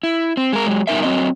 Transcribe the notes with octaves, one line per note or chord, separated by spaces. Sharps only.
E4
C4
G#3 A#4
F#3 G#3
G2 B2 D#4 A#4 E5
F#3 C4 D#5